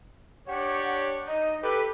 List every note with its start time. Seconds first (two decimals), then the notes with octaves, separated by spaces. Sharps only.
0.48 D4 G4 C#5 F#5
1.27 D#4 D#5
1.63 G4 A4 B4